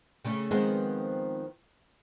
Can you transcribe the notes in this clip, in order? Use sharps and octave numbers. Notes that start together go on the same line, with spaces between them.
C#3 A3 C#4
D#3 F3 G#3 B3 C4